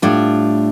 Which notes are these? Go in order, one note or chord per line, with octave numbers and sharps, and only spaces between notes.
A2 G3 D4 F4